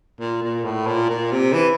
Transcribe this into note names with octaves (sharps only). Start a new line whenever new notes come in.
A#2
A#2
A2
A#2
A#2
C3
E3